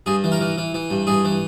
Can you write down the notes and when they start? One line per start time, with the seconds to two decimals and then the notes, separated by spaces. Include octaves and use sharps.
0.06 G2 G#4
0.24 E3
0.32 A#4
0.41 E3
0.58 E3
0.74 E3
0.90 G2
1.07 G2 G#4
1.25 E3